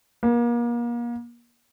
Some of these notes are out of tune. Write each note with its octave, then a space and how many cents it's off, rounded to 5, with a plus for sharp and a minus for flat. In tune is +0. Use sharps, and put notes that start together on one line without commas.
A#3 +35